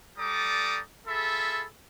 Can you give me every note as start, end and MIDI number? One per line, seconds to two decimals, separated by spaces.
0.18 0.80 55
0.18 0.80 69
0.18 0.80 74
0.18 0.80 82
0.18 0.80 86
0.18 0.80 87
1.07 1.64 65
1.07 1.64 68
1.07 1.64 69
1.07 1.64 76
1.07 1.64 83